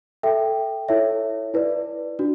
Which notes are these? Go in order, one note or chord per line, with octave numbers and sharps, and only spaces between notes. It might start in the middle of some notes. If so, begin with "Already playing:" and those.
A4 E5 G5
E4 A4 C#5 E5
E4 B4 D5
D4 F#4